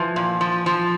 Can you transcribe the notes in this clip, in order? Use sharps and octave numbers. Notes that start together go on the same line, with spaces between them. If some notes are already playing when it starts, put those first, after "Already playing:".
Already playing: E3 F3
A#2
F3
F3